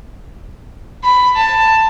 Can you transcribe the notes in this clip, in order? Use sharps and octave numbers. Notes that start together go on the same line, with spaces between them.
B5
A5